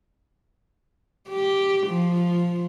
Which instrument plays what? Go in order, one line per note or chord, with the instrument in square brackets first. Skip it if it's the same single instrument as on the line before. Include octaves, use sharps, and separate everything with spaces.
[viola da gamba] G4
F3